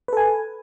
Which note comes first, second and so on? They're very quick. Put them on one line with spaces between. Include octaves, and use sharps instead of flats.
B4 A4 G#5